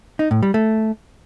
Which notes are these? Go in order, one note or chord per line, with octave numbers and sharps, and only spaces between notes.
D#4
A2
G3
A3